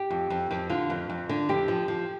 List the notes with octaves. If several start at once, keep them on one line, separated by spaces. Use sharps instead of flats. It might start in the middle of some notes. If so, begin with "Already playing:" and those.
Already playing: G4
F2
F2
F2
D3 F4
F2
F2
D3
F2 G4
F3
F3